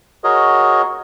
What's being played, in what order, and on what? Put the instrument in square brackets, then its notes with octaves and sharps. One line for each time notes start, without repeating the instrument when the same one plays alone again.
[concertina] F#4 G#4 A#4 C#5 D#5